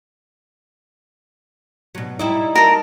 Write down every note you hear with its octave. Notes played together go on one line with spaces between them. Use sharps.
B2 F#3
G3 D#4 E4 D#5
A4 A#4 A#6